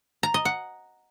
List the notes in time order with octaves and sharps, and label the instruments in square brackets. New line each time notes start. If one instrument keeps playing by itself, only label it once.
[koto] A#5
D#5
F#5